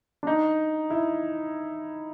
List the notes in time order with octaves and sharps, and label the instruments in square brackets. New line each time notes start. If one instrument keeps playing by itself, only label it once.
[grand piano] D4
D#4
E4